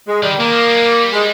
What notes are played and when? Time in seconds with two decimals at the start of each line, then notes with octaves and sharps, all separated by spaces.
0.08 G#3
0.23 D#3 G3
0.38 D#3 A#3
0.52 F3
0.68 G3
0.76 G#3
0.82 G3
1.13 G#3